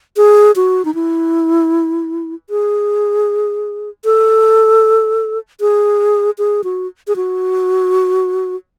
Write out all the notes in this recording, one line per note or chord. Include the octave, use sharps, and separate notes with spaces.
G#4
F#4
D#4
E4
G#4
A4
G#4
G#4
F#4
G#4
F#4